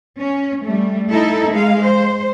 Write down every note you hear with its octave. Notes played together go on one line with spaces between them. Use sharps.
C#4
G3 A3
D#4 E4 A4
G#3 F5
C5